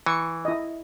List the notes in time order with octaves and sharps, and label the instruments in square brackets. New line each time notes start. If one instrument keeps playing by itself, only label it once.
[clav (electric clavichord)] E3 [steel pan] C#6
[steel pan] E4 D#5